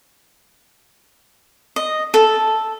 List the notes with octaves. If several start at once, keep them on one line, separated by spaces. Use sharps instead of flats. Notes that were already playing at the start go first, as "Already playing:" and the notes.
D#5
A4